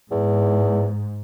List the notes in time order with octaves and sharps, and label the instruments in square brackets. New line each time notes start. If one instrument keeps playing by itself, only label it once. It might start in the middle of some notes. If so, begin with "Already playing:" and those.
[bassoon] E2 [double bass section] G#2